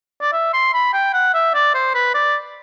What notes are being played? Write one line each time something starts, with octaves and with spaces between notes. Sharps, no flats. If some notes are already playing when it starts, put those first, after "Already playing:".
D5
E5
C6
B5
G5
F#5
E5
D5
C5
B4
D5